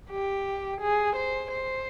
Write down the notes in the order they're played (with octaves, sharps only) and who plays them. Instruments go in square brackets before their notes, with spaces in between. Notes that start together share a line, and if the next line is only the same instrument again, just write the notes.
[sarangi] G4
G#4
C5
C5